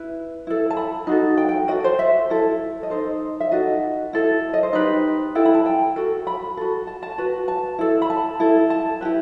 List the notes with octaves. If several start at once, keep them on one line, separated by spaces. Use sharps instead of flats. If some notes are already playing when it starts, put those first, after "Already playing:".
Already playing: E4 B4
E4 A4
A5
B5
D#4 F#4 A4
G5
G5
F#4 A4 D#5
C5
E5
E4 A4
D#5
D#4 A4 C5
E5
D#4 F#4 A4 D#5
E4 A4
D#5
C5
D#4 G4 B4
E4 A4 G5
B5
A5
G5
F#4 A4
B5
F#4 A4
A5
A5
F#4 B4
A5
E4 A4
B5
A5
E4 A4
A5
E4 G4 B4